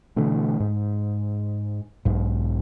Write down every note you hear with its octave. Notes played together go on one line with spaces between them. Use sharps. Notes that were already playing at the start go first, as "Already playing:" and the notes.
B2 D3 E3 A3
G#2
B1 G#2